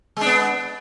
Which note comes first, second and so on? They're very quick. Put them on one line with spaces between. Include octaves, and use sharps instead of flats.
G#3 D4 B3